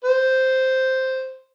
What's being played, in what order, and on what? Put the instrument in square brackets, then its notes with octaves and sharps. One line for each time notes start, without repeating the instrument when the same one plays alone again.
[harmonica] C5